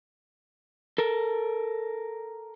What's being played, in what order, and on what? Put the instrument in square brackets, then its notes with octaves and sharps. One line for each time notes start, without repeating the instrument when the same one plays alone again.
[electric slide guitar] A4 A#4